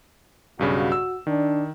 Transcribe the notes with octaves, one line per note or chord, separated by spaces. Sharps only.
B1 G2 C#3 F#4
E6
D#3 D4